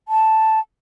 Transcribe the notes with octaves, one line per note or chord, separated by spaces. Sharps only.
A5